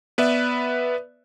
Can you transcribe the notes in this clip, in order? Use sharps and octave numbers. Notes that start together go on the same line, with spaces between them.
B3 B4 D5 E5